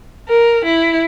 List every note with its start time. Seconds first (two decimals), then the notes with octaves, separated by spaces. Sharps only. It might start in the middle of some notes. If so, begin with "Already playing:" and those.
0.29 A#4
0.65 E4